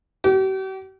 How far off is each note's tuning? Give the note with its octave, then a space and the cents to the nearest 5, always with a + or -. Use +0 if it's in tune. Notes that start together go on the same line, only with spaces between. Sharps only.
G4 -45